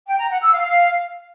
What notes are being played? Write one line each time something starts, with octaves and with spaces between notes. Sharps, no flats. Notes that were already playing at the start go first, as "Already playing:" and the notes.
G5
A#5
F#5
E6
F5